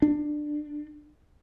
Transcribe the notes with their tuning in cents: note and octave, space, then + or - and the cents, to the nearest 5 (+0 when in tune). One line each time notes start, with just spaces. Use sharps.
D4 +20